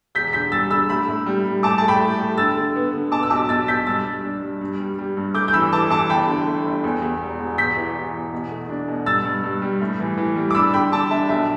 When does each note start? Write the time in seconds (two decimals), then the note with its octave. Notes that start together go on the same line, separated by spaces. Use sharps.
0.15 E1 G6 B6
0.33 D3 G6 B6
0.52 G3 E6 A6
0.71 D3 B5 E6
0.89 A2 B5 E6
1.09 A2
1.26 G3
1.45 G3
1.63 A2 A5 D6
1.78 A3 A5
1.88 G5 B5
2.00 A2
2.19 A3
2.37 D3 E6 A6
2.57 D3
2.76 B3
2.94 D3
3.12 B2 A5 D6
3.23 E6
3.30 B1 A5 D6
3.49 B2 E6 A6
3.68 B1 G6 B6
3.87 G2 E6 A6
4.05 G2
4.24 D4
4.43 G2
4.61 G2
4.80 G3
4.99 G3
5.17 G2
5.34 A3 D6 G6
5.48 G6
5.53 E3 B5 E6
5.72 E3 A5 D6
5.90 E3 A5 D6
6.10 G1 G5 B5
6.27 D3
6.47 A3
6.65 G1
6.84 E2
7.02 E2
7.20 E1
7.39 E1
7.58 E2 G6 B6
7.77 E3
7.96 E3
8.14 E2
8.33 B2
8.51 A3
8.69 D4
8.88 B2
9.06 G2 E6 A6
9.25 G2
9.44 G2
9.62 G3
9.81 A2
10.00 E3
10.17 E3
10.36 G3
10.51 D6
10.54 D4 B5 E6
10.74 D3 G5 B5
10.92 D3 A5 D6
11.11 D4 E5 A5
11.29 B1 E5